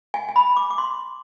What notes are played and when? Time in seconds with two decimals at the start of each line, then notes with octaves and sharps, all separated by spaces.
0.14 G#5
0.29 G#5
0.36 B5
0.56 D6
0.70 D6
0.78 C6